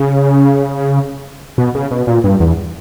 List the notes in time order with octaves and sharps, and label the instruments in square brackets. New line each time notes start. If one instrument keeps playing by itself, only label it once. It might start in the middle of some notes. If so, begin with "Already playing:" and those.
Already playing: [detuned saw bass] C#3
B2
C#3
B2
A#2
G2
E2